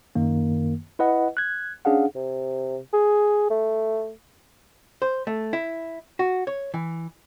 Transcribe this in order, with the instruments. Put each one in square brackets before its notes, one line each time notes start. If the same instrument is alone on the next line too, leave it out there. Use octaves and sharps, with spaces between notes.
[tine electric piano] F#2 D#3 A#3
E4 B4 D#5 F#5
F#6 G#6
C#4 D4 G#4 F5 F#5
[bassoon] C3
G#4
A3
[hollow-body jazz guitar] C5
A3
E4
F#4
C#5
E3